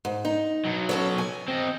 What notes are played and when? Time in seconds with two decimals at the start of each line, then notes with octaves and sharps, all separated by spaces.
0.05 G#2
0.25 D#4
0.65 B2 F#3
0.89 C#4 A4 C#5
1.18 G#5
1.48 C4 D#5